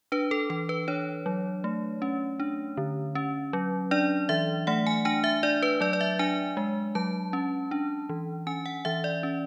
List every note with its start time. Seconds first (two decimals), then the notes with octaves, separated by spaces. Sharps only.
0.12 D4 B4
0.31 A4
0.50 E3 A4
0.69 B4
0.88 D4 C#5
1.26 F#3
1.64 A3
2.02 C#4
2.40 D4
2.77 D3
3.15 C#4
3.53 F#3
3.91 D4 D5
4.29 E3 E5
4.67 A3 F#5
4.87 G#5
5.05 D4 G#5
5.24 E5
5.43 D4 D5
5.63 B4
5.81 F#3 D5
5.93 D5
6.01 E5
6.19 D4 G#5
6.57 G#3
6.95 F#3 A5
7.33 C#4
7.71 D4
8.09 E3
8.47 C#4 G#5
8.66 F#5
8.85 E3 E5
9.04 D5
9.23 C#4